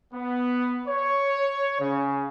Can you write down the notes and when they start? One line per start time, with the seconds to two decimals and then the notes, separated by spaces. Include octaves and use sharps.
0.14 B3
0.87 C#5
1.80 C#3